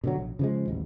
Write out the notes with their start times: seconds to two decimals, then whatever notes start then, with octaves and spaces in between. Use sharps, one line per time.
0.04 B2 D3 F#3
0.18 A#1
0.39 C#3 F3 G#3
0.68 D#1 A1